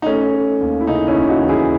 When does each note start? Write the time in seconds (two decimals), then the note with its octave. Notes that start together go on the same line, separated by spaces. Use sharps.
0.02 D#4
0.06 A3 C#4
0.33 A3
0.61 D#2
0.81 E4
0.87 C#3 D#4
1.08 C#4 E4
1.14 D#2
1.28 D#4 F#4
1.42 E3
1.49 E4 G#4